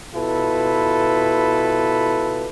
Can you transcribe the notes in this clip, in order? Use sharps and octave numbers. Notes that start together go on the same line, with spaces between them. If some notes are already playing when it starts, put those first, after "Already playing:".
B2 E4 F4 A4 B4